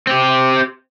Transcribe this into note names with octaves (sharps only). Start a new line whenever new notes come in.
C4 G4